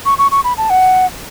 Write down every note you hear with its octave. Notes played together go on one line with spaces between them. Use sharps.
C#6
C#6
C#6
B5
A5
F#5